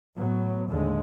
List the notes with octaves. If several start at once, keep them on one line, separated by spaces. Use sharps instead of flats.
A2 F#3 B3
D#2 A2 D3 G#3